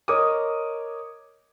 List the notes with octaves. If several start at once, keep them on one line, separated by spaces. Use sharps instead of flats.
A#4 C#5 D#5 D6 D#6